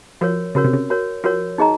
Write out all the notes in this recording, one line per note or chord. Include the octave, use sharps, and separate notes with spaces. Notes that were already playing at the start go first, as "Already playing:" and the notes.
F3 F#4 A#4 C#5
C#3 F#4 A#4 C#5
C3
C#3
F#4 A#4 C#5
F3 F#4 A#4 C#5
D#4 G#4 D#5 A#5